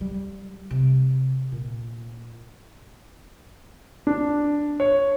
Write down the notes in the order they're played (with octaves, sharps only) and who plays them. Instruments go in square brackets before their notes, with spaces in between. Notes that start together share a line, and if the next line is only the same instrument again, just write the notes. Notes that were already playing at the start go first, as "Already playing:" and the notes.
[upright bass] G3
C3
A#2
[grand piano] D4
C#5